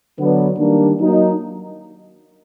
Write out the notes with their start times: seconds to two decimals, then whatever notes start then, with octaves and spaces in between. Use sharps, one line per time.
0.18 D3 F#3 B3 D4
0.58 D#3 G3 A#3 D4
1.00 F#3 A#3 D#4